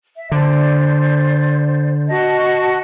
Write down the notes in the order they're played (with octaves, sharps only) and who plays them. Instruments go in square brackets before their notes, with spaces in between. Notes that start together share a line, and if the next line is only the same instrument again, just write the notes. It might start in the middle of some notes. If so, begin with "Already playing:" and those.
[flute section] E5
[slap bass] D3 [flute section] C5 D5
[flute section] F#4 D#5 A5